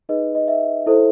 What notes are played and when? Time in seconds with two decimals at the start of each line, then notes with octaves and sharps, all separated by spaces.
0.09 D#4 G#4 B4 D#5
0.35 D#5
0.48 E5
0.86 E4 A4 C5